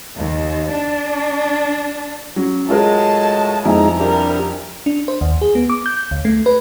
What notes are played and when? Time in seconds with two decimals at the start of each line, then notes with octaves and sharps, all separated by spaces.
0.18 D#2
0.71 D4
2.36 F#3 C#4
2.68 A2 F#3 G#3 F4 G#4 A#4 A5
3.65 F2 G#3 D#4 E4 G#5 A#5
4.00 C3 G3 D4 G4 A#4 A#5
4.86 D4
5.08 C5
5.21 D#2
5.41 G#4
5.55 B3
5.70 D6
5.86 G6
6.11 D2
6.25 A3
6.46 B4